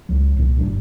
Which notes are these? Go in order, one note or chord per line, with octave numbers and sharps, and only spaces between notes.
C#2 F#3
C2 A#2 F3
G1 F#3 D4